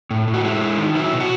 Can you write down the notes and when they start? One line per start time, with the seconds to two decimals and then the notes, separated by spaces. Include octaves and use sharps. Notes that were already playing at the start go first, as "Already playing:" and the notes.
0.11 A2
0.28 A2
0.34 F#4
0.44 G#3 E4
0.61 G#3
0.78 D#3
0.95 F#3 E4
1.13 B2
1.20 F#4